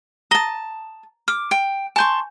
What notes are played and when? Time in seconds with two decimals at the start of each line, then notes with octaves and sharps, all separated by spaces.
0.31 A5 A#5 D#6 A#6 G7
1.28 D6 F6
1.51 G5
1.96 G#5 A5 C6 C#6 G6